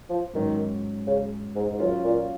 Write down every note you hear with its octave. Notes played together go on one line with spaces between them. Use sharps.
F3
G#2 D#3 F#3 C#4
C#3
G#2
G#2
F#2 F#3 C#4 F4
A#2